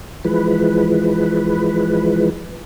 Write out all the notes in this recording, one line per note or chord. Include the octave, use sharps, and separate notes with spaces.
E3 F3 G#3 B4